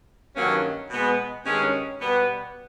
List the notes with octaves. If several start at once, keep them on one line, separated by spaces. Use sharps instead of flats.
G2 D#3 F#3 A#3 C#4
B2 G#3 B3
G2 D#3 G#3 C#4
B2 G3 B3